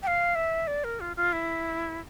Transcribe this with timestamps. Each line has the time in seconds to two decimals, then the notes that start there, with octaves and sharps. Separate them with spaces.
0.03 G5
0.07 F5
0.35 E5
0.67 D5
0.84 A#4
1.00 F4
1.17 F4
1.33 E4